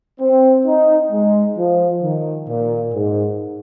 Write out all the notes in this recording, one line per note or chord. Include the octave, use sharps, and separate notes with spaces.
C4
D#4
G#3
F3
D#3
A#2
G#2